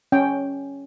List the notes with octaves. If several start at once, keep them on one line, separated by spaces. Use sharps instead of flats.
C#4 G5